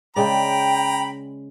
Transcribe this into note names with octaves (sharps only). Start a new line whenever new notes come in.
C#3 G#3 D5 G5 A#5 B5